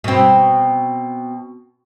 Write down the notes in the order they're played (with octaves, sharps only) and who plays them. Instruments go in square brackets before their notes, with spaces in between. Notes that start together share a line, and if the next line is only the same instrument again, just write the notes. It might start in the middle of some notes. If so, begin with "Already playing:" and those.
[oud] B2 C4